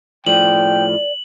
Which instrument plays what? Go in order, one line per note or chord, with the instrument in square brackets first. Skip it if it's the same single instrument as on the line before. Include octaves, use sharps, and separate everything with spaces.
[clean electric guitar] A2 F3 [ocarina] D5 [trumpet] G5 [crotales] F#7